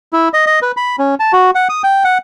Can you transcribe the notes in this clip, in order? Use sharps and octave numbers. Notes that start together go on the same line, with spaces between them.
E4
D#5
D#5
B4
B5
C#4
A5
F#4
F#5
D#6
G5
F#5